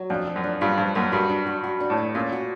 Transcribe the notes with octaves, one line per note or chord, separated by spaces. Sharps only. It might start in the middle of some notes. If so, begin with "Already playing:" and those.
Already playing: F#3
F2 D4
F3
F#2
D4
G2 F4
G2 F3
F#2 A#3
G2 F#4
D4
F#4
F#4
D4
A2
A3
A#2 C#4
F#4